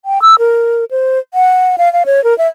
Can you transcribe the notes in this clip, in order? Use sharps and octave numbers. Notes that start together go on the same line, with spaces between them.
G5
E6
A#4
C5
F#5
F5
F5
C#5
A#4
E5